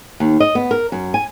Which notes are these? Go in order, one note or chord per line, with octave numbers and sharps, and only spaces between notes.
D#2
D#5
B3
A#4
F#2
G#5